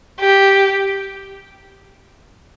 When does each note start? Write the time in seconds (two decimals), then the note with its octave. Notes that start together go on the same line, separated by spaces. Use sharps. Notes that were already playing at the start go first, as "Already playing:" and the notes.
0.20 G4